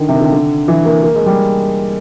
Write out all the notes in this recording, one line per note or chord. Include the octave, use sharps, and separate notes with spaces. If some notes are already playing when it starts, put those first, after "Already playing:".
Already playing: D3 D#3
C3
D#3
D3
D3
E3
A#3
A#3
G#3
G3